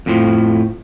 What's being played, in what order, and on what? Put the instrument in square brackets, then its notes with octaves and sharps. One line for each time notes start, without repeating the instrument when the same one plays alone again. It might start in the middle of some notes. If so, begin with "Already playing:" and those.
[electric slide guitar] F2 A2 F3